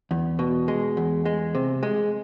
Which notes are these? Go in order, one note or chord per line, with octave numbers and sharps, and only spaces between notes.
E2
B2
G#3
E2
G#3
C3
G#3